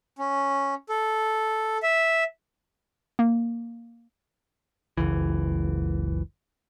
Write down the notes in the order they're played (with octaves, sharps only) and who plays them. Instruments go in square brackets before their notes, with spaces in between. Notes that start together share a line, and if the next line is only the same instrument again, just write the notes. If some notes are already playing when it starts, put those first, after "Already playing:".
[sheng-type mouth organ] C#4
A4
E5
[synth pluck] A#3
[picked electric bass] F#1 C#2 E3